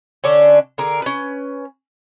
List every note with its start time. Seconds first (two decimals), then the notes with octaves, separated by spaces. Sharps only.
0.24 D3 C#4 D4
0.78 D3 G#4 A#4 A#5
1.02 C#4 B4